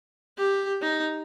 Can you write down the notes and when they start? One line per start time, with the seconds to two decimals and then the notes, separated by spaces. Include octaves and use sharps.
0.37 G4
0.82 D#4